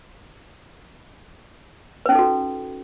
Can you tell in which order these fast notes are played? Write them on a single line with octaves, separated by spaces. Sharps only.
B4 C#4 D#4 A4 F#4